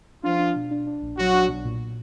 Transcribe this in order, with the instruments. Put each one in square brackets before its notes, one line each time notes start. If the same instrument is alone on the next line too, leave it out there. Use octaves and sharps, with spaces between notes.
[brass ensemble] F3 F4 [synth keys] D4
[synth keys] D4
B2
D4
D4
A#1
[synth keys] A#1 [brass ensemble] F#3 F#4
[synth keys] D4
B1
A#2